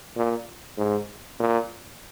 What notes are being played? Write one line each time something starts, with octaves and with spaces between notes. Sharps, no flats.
A#2
G#2
A#2